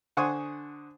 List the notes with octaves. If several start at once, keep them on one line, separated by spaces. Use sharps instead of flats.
D3 C5 F#5 G#5 C#6 D#6